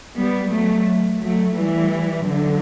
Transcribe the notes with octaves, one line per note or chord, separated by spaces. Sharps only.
G3 B3
F#3 A3
F#3 A3
E3 G3
D3 F#3